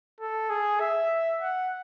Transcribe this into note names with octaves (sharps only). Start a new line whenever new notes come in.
A4
G#4
E5
F#5